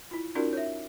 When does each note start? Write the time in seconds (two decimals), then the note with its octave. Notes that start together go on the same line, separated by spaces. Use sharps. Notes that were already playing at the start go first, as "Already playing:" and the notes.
0.11 E4 F4
0.35 C#4 D#4 F4 F#4 A#4 D5
0.53 C#5 E5